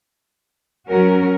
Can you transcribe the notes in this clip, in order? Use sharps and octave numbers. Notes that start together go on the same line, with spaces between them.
F#3 C#4 F#4 A#4